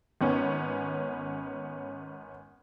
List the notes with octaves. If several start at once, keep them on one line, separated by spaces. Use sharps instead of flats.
G#1 B3 C#4